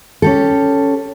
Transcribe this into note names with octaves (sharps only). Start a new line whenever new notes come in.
C#4 G4 A4